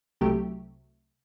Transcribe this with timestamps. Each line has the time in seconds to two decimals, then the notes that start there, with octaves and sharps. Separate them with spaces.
0.21 C2 C3 F#3 A3 G4